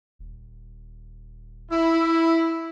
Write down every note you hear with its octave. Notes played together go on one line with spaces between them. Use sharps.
D#1
E4